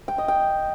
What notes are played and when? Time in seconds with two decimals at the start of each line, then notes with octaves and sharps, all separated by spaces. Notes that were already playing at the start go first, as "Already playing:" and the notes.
0.08 G5
0.18 D#5
0.28 G5